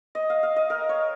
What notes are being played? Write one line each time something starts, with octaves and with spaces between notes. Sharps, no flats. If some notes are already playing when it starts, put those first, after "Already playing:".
D#5
F5
F5
D#5
A#4
C#5